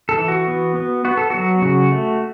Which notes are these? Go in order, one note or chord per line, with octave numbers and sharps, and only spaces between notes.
A4
E3
F#4
B3
B3
B3 F#4
A4
F#3 F#4
C#3 F#4
A3